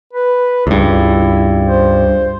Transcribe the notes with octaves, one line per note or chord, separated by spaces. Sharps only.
B4
C#2 G2 E4
C5